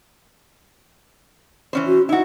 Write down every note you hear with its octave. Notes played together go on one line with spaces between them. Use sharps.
E3 C#4 C5
F#4
D#4 E4 F#4